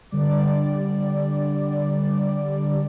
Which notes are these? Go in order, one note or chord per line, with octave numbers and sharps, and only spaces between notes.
D3 G3 D5